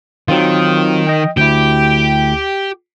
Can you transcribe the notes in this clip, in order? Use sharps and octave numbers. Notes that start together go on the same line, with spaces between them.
D#3 F#3 C4 F4
D#5 G5
D2 E4 G4